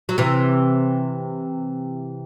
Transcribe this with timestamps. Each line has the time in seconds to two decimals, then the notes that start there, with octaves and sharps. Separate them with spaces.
0.09 F#3
0.18 C3 E3